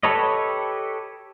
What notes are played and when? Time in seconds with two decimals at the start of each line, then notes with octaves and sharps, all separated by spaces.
0.03 G4 A4 B4 C#5 D#5